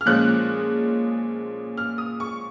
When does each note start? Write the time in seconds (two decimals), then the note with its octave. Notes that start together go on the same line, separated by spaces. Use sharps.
0.01 F6
0.06 A#2 F3 G#3 C#4 F#6
1.78 F6
1.98 D#6
2.20 C#6